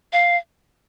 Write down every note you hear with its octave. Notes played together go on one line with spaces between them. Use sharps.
F5